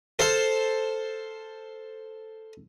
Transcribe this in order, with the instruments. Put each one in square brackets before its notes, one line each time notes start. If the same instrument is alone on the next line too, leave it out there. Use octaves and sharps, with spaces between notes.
[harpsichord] A4 C5 F5